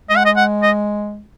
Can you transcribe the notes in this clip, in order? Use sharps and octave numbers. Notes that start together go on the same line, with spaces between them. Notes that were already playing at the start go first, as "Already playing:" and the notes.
G#3 D#5
F#5
D#5
F#5
D#5